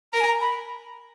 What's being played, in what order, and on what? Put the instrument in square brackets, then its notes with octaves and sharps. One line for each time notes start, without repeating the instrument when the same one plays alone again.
[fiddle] A#4 [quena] A#5
[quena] G#5
A#5
B5